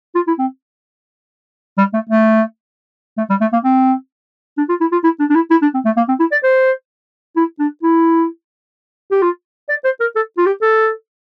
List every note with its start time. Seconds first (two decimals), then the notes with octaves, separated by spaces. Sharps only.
0.15 F4
0.27 E4
0.39 C4
1.78 G3
1.94 A3
2.09 A3
3.18 A3
3.30 G3
3.41 A3
3.53 A#3
3.64 C4
4.58 D4
4.69 F4
4.81 E4
4.92 F4
5.04 E4
5.20 D4
5.30 D4
5.35 E4
5.51 E4
5.62 D4
5.74 C4
5.85 A3
5.97 A#3
6.08 C4
6.20 E4
6.32 D5
6.43 C5
7.36 E4
7.60 D4
7.83 E4
9.12 G4
9.22 F4
9.69 D5
9.84 C5
10.00 A#4
10.16 A4
10.38 F4
10.46 G4
10.62 A4